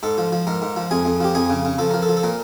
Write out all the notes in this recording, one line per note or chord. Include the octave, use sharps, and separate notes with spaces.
G#2 A4
F3
F3
G#2 A#4
G#2
F3
F2 G#4
F2
F3 G4
F2 G#4
C#3
C#3
F3 A4
F3 A#4
A4
F3
A4
A#2 A#4